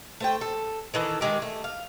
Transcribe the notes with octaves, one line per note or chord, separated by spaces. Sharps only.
A3 C5 G5
A4
D#3 E3 A4 D#5
D#3 E3 G#3 G4
A3
F5